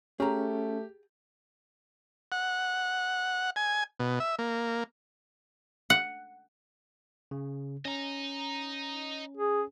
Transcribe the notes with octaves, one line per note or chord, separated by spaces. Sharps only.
A3 C#4 G4 G#4 A#5
F#5
G#5
B2
E5
A#3
F#5
C#3
C#4 D#5 A#5
G#4